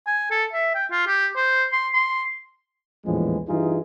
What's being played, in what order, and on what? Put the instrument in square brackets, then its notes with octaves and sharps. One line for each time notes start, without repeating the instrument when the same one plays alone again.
[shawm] G#5
A4
E5
G5
F4
G4
C5
C6
C6
[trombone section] A#1 E2 A2 E3 F3 G#3
G2 E3 D#4 F4 G#4